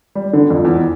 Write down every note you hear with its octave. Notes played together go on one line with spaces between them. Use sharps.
G3
D3
F2
E2